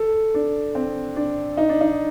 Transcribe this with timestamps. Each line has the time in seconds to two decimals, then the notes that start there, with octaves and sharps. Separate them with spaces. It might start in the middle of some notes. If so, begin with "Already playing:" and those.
Already playing: A4
0.34 D4
0.75 C4
1.16 D4
1.57 D#4
1.69 D4
1.81 D#4